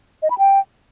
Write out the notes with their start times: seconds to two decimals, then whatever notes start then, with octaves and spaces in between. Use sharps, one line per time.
0.22 D#5
0.30 B5
0.38 G5